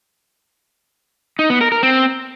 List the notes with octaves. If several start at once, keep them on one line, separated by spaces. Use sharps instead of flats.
D#4
B3
A#4
A#4
C4